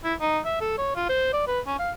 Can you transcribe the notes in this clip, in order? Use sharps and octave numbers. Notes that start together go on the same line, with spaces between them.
E4
D#4
E5
A4
C#5
F4
C5
D5
B4
C#4
F5